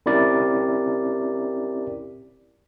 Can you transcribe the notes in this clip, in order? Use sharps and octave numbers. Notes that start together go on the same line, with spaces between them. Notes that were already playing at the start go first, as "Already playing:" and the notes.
C4 C#4 E4 G4 A#4 D5